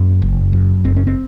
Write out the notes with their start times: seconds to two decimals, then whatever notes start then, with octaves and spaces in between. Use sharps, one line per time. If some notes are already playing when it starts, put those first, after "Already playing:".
Already playing: F#2 A#3
0.22 F#1
0.53 F#2
0.84 F#1 C4
0.96 C#4
1.07 C4